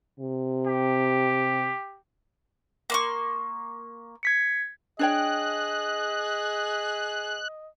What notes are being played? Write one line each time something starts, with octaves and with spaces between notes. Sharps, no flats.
C3
G4
A#3 C6 C#6
G#6 B6 C#7
D4 G#4 C#5 D#5 G5 F#6